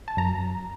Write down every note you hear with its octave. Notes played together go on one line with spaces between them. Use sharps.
A5
F#2 A#5